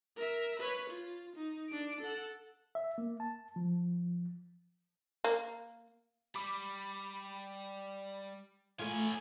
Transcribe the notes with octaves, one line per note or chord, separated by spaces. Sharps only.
A#4 E5
B4 C#5
F4
D#4
D4 D7
A4 F#5
E5
A#3
A5
F3
A#3
G3 B5 D6
A2 A3 F4 G#5